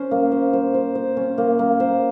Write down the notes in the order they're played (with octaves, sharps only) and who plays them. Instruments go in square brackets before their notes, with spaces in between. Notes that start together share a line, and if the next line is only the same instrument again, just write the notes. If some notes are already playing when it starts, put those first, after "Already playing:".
Already playing: [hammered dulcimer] C#4 C5
A#3
C5
C5
C5
C5
C#4
A#3
A#3
C5